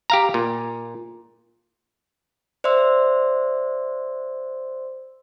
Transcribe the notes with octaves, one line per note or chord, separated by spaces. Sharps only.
G4 F5 A#5
A#2
C5 D5 E5 C6 E6